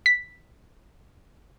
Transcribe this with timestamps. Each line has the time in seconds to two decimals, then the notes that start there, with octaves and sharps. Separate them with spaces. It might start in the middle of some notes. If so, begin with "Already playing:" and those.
0.06 B6